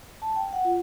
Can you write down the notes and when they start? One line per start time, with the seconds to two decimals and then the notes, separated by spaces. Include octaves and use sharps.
0.22 A5
0.36 G5
0.53 F#5
0.65 F4